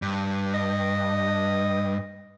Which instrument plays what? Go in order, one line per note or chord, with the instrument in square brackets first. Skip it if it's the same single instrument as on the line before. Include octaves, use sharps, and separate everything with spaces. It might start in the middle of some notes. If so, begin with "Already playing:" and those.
[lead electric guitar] G2
[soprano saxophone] D#5